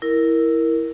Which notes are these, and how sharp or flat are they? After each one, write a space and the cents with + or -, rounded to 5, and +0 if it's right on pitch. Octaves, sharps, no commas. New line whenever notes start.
E4 +0 A#4 +0